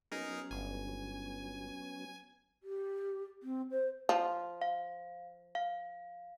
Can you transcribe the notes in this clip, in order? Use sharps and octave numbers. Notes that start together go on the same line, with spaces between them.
F#3 B3 C#4 D#4 G#4 A#4
G1 G#5
G4
C4
C5
F3
F5
F5